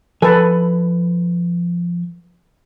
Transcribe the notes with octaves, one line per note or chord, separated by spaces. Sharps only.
F3 A4 B4 G#5